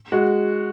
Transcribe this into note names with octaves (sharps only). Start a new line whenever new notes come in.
G#3 F#4